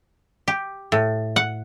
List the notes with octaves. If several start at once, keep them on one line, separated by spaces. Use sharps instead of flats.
G4
A2
F#5